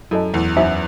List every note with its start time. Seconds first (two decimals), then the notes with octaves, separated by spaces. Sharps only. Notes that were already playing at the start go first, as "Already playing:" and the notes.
0.11 F#2 E4 A4 D#5 A5
0.34 E2
0.57 F#2 D#4 F#4 C5 E5 G#5